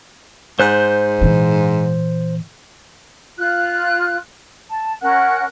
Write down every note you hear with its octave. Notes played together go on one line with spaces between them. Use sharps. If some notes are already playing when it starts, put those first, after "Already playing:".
G#2 C5 F#6 G6
A#2 E3
F4 F#6
A5
C#4 A#4 F#5 F#6